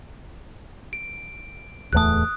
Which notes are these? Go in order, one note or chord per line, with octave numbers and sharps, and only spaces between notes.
D7
D1 E2 A3 D#6 F#6